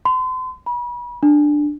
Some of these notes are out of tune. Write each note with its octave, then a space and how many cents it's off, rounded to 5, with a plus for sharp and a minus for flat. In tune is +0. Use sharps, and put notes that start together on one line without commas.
C6 -40
B5 -35
D4 +10